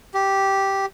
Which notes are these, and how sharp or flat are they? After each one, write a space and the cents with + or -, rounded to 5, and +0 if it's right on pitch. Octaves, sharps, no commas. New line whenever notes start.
G4 -5